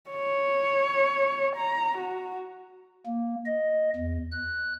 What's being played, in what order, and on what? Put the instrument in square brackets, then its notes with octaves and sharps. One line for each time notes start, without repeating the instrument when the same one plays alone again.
[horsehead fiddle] C#5
A#5
F#4
[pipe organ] A#3
D#5
E2
F#6